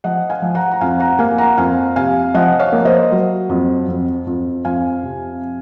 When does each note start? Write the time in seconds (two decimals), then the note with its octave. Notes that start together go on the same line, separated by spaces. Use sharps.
0.04 F3 D#5 F#5
0.30 F5 G#5
0.42 F3
0.55 F#5 A#5
0.71 A#5
0.81 F2 F5 G#5
1.00 F#5 A#5
1.19 A#3 F5 G#5
1.38 F#5 A#5
1.58 F2 F5 G#5
1.96 C3 F5 G#5
2.34 F3 D#5 F#5
2.59 C#5 F5
2.72 A#3
2.85 C5 D#5
3.11 F#3
3.49 F2
3.88 F2
4.27 F2
4.65 F2 F5 G#5
5.03 C3